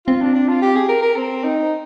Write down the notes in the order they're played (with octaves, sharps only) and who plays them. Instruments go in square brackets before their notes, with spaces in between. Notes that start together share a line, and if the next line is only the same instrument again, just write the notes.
[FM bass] C4 [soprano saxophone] F4
[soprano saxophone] D4
D4
F4
G4
G#4
A#4
A#4
C4
D#4